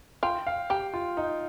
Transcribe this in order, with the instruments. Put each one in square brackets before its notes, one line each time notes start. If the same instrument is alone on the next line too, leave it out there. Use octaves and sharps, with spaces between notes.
[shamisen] F4 [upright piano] G5
[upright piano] F5
[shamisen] G4 [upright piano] G5
[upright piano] F4
D#4